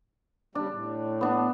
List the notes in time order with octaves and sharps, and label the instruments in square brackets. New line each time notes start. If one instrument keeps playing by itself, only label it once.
[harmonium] C#3 G3 [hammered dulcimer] D4
[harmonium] A2
[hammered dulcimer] B3 D4